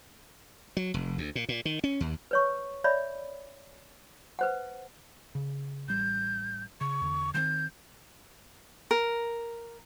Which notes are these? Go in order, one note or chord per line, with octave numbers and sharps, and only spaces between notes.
F#3
F1
D2
A#2
A#2
D#3
C#4
D#2
B4 C#5 C#6
C#5 D5 E5 B5
B4 C5 F#5
C#3
A1 G3 G6
C#3 C#6
E2 D3
D#3 E3 C4 G6
A#4